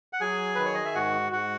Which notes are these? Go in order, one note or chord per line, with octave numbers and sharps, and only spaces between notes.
F#5
F#3 G#4 G#5
D#3 B4
C#5
D#5
E5
G#2 F#4 F#5
G#2 F#4 F#5